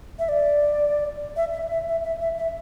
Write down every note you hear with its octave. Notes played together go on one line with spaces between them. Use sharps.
E5
D5
E5
E5
E5
E5
E5
E5
E5